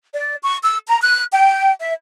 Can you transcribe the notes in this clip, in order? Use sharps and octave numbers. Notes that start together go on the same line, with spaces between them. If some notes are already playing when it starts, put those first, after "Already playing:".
D5
C#6
E6
A#5
F#6
G5
E5